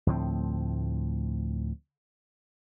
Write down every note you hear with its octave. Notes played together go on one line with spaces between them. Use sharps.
D2 A2 F3 C4